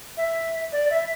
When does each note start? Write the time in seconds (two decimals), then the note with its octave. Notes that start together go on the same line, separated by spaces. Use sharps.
0.17 E5
0.72 D5
0.90 E5